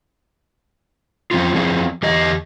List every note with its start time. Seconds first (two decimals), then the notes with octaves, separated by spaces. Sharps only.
1.31 F3 C4 C#4 F4
1.55 F3 F#3 C4 G#4
2.03 E2 G4 D#5